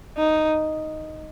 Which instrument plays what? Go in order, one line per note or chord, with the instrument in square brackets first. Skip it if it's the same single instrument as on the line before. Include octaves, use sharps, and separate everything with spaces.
[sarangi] D#4